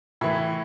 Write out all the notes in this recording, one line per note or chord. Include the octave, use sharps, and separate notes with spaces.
A2 E3 E4